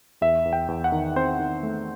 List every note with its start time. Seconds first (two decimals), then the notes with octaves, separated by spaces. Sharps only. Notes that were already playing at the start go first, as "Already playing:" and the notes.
0.21 E2 E5
0.45 E2
0.53 G5
0.68 E2
0.84 F#5
0.92 D#3
1.16 C4 C5
1.39 D#3
1.63 A3